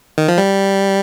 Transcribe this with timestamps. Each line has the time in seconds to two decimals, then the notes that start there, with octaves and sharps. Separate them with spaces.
0.18 D#3
0.28 F3
0.38 G3